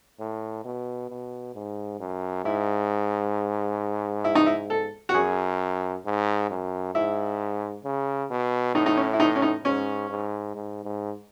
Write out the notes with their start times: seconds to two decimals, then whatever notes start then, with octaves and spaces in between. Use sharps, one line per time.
0.20 A2
0.65 B2
1.10 B2
1.55 G#2
2.00 F#2
2.45 G#2 E4
4.24 E4
4.35 D#4
4.46 E4
4.70 A4
5.09 F#4
5.14 F#2 G#4
6.05 G#2
6.50 F#2
6.95 G#2 E4
7.85 C#3
8.31 B2
8.75 A2 D#4
8.86 D#4
8.97 C#4
9.13 E4
9.20 D#4
9.35 C#4
9.42 D#4
9.65 G#2 C#4
10.10 G#2
10.55 G#2
10.84 G#2